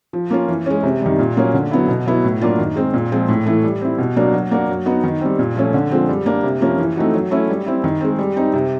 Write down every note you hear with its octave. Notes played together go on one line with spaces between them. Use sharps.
F3
A#3 C#4 F4
E3
G#3 C#4
C3
D#3 G3
A#2
F#3 A#3 C#4
D3
F#3 B3 E4
B2
F#3 B3 E4
A2
F#3 A#3 D4 F4
D#3
G#3 C4
A#2
F3 G#3 C4 F4
A2
E3 A3
G3
C4 E4
B2
F#3 A#3 D4
F#3
A#3 D4 F#4
F#3
B3 D#4 F#4
D#3
G3 C4
A#2
F3 A3 C#4
D3
F3 G#3 C4
G3
A#3 D4
C3
F3 A#3 C#4
E3
A3 C4 D#4 F#4
F#3
A3 C#4 E4
G3
C4 E4
D#3
G#3 C4
G3
C4 D#4
C3